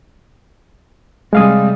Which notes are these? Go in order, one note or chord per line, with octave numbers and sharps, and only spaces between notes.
C3 G3 G#3 F5 D#6